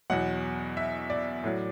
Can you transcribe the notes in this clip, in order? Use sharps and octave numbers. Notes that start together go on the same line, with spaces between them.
E2 B2 F#3 F#5
E5
D5
A2 F#3